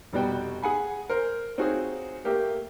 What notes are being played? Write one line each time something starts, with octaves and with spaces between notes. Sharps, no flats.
F1 B2 G3 B3 F#4 G5
G#4 F#5 G#5 B5
A#4 C5
C4 D#4 F4 F#4 G#4 C#5
A3 A#3 G4 A#4